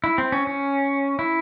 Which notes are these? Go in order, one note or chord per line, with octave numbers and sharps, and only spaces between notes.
E4
C4
C#4
C#4
E4